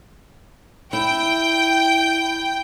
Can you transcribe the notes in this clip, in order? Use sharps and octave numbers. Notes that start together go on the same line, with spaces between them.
E4 G5